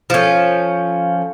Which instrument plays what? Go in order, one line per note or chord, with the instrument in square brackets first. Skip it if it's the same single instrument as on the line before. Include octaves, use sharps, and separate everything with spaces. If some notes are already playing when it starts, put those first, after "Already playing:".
[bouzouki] F3 C#4 [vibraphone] A4 F5